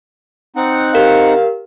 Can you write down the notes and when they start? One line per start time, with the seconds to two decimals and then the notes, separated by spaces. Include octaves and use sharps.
0.56 C4 D#4 F#5
0.95 G4 A#4 F5